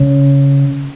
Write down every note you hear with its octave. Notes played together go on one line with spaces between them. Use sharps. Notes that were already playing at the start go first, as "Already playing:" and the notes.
Already playing: C#3